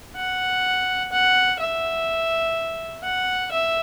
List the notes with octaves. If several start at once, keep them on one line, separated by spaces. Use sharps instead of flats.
F#5
F#5
E5
F#5
E5